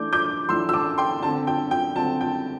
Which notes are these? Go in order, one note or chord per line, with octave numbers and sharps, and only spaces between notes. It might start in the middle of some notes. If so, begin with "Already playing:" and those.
Already playing: E3 A3 D4 D6 G6
D6 G6
E3 A3 D4 C6 E6
E6
A5 D6
G5 C6
D3 C4 A5
G5
G5
D3 C4 A5
G5